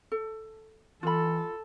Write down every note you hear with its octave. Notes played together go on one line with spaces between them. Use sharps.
A4
E3 F4 A4 B5